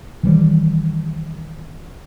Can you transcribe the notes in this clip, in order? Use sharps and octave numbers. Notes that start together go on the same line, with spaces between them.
D#3 E3 G3